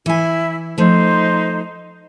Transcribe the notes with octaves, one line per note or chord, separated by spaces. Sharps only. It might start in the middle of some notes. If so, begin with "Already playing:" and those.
E3 E4 G#5
F3 A3 D#4 C5